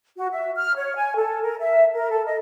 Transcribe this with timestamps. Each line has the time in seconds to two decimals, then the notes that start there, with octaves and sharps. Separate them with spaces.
0.17 F#4
0.32 E5
0.56 F6
0.76 C#5
0.96 G#5
1.16 A4
1.42 A#4
1.60 E5
1.94 A#4
2.10 A4
2.25 D#5